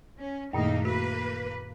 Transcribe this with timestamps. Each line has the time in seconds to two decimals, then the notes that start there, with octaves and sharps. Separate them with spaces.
0.19 C#4
0.53 F#2 A#2 D#3 A3 A#3 D#4
0.85 A#3 F#4 B4